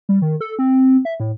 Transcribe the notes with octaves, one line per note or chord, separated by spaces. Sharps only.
G3
D#3
A4
C4
E5
A2